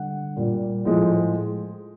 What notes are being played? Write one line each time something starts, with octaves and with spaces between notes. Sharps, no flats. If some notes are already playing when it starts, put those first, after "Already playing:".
Already playing: D3 G3 F#5
A#2 G3
A2 F3 G#3